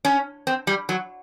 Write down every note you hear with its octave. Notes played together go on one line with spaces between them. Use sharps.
C#4
C4
G3
F#3